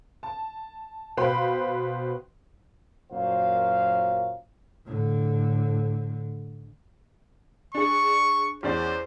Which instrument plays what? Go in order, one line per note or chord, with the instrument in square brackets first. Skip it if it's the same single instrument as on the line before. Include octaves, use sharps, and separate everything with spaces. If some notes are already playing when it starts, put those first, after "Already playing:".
[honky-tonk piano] A5
B2 B4 C5 F5 G5 B5
[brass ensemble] F#2 A#2 F#3 C5 F5
[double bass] A2 D3
[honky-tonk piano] D4 G#4 [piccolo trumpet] C#6
[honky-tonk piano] E2 C#4 D5 [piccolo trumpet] C5